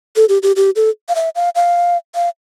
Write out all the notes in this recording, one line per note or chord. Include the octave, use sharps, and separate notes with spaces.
A4
G4
G4
G4
A4
F5
E5
F5
F5
F5